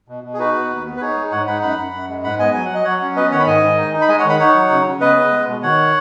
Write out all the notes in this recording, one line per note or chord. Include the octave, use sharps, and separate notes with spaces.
B2
B2
G#4
D#4 F#4 B4
B3
D#2
B3
B4
D#4 G#4 C#5
G#3
G#2 C#5 F#5
D#4 F#5 B5
F#2 F#5 B5
F#2
F#2
G#3
G#2 F#5 B5
B3 D#5 G#5
F#3 G#5
F#5
F#3 D#5
F#3 C#5 F#5
C#4
B3 B4 D#5
D#3 C#5 F#5
B5
G#2 D#5 G#5
D#3
D#4
D#4
B5
G#3 D#5 G#5
C#5 F#5
D#3
F#5 B5
D#4 C#5 F#5
F#3
C#3
C#3
B3 B4 D#5
B3
G#3
B2
D#3 C#5 F#5